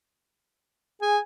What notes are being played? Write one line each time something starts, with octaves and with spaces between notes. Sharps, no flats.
G#4 G#5